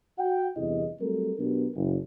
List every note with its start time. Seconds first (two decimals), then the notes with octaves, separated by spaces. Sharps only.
0.18 F#4 F#5 G5
0.57 G1 E2 C3 E4 G#4 D#5
1.00 F#3 G3 A3 C4 A4 A#4
1.39 B2 F#3 B3 D4 G4 A#4
1.76 F#1